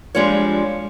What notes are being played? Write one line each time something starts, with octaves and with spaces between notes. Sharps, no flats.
F3 G3 G#3 D4 F4 C#5